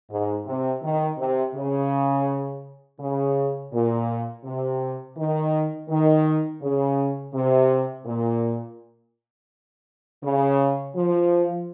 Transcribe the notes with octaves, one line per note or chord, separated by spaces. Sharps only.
G#2
C3
D#3
C3
C#3
C#3
A#2
C3
D#3
D#3
C#3
C3
A#2
C#3
F3